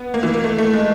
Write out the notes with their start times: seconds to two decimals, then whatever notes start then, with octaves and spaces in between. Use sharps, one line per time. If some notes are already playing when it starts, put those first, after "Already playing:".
Already playing: B3
0.14 A#3
0.23 E3
0.34 A#3
0.44 A3
0.58 A3
0.73 G#3